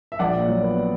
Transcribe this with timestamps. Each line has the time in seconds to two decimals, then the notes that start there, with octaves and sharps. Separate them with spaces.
0.12 E5
0.19 A#1 D5 F#5
0.35 A#2
0.48 F#3
0.63 B3